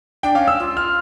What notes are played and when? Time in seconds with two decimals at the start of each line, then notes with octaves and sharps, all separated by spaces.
0.23 D4 G5
0.35 C#4 F5
0.48 E6
0.59 F4
0.77 F6